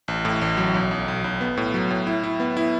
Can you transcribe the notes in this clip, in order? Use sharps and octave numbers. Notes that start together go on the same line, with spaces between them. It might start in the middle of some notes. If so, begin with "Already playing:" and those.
A1
A2
A1
F#3
B1
B1
B1
B1
B3
A2
F#3
A2
E4
E4
B3
E4